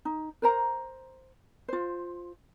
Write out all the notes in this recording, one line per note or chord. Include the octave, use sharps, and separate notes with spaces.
D#4
A#4 C5 A#5
F4 C5